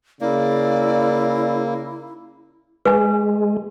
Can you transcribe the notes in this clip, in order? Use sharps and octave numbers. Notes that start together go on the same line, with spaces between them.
C#3 A#3 E4 D5
G#3 B4 G#5